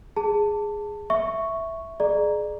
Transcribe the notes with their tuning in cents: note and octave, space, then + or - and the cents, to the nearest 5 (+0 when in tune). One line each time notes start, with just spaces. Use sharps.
G#4 +0 A5 +15
E5 +0 C#6 +0
G#4 +25 D5 +30 A#5 +5